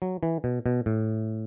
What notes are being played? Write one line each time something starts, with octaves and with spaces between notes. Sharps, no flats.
F#3
E3
B2
B2
A2